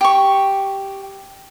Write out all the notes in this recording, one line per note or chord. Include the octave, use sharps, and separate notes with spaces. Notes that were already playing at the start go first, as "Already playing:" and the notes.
G4 C#6